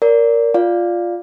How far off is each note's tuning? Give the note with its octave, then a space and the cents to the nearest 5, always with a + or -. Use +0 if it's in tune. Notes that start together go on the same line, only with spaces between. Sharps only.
A#4 +0 D5 -25
F4 +0 D5 +0 F5 +0